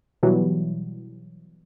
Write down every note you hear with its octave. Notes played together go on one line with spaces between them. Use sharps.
B2 E3 F#3 G3